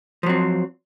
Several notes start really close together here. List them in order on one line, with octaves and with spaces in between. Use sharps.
F3 F#3 C4